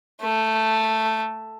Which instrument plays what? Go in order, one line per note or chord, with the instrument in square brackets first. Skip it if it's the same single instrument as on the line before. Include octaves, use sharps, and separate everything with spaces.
[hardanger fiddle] A3